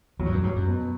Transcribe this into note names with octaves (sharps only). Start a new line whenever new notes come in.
E2 F#3
G2
F#2
G2 F#3
F#2
B2